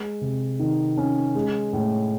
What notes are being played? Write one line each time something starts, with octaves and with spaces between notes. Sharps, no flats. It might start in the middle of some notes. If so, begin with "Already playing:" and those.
Already playing: G#3
C3
D#3
C#4
G#3
A2